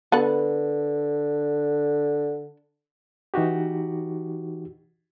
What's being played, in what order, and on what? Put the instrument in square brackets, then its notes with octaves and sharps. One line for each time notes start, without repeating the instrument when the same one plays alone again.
[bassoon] D3 [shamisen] B3 A4 B4
[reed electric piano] E3 D#4 F#4 G4